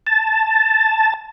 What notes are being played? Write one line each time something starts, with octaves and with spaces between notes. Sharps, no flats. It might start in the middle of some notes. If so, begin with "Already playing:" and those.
A5